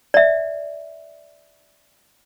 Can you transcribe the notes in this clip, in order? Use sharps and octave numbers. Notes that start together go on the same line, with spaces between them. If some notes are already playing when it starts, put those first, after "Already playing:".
D5 E5